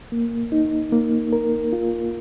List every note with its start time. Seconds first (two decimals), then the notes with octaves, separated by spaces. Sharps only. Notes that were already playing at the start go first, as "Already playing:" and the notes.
0.12 A#3
0.52 D#4
0.92 A#3
1.33 A#4
1.73 F4